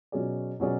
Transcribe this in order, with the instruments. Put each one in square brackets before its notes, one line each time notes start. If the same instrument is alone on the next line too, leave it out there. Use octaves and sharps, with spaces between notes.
[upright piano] B2 F#3 C#4 G#4 D5
B2 F#3 C#4 G#4 D5